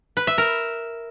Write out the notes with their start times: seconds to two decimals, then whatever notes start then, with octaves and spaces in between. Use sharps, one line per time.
0.17 B4
0.27 E5
0.38 A#4